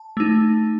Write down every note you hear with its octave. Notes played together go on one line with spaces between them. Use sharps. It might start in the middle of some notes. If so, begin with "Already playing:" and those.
Already playing: A5
A3 D#4